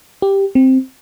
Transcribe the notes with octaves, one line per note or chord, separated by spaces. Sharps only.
G4
C4